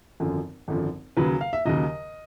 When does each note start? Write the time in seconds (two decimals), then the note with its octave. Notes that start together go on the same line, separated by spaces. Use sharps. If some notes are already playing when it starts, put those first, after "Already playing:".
0.20 G#1 F#2 D3 F3
0.68 G#1 F#2 D3 F3
1.17 D#2 C#3 F#3 B4
1.41 F5
1.53 E5
1.65 D#2 C#3 F#3 D#5